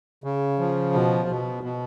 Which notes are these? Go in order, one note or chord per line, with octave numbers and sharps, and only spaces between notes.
C#3
F3
B2
B2
B2